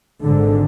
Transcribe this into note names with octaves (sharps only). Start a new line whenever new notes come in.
G#1 G#2 D3